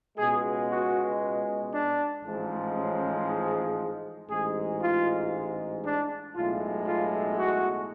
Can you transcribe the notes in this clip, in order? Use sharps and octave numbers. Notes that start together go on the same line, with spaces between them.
C#2 B2 G#3 G#4
F#4
D4
A1 G#2 F3 G#3
C#4
A1 G#2 G#3 G#4
F4
D4
B1 A2 G#3 F4
F4
F#4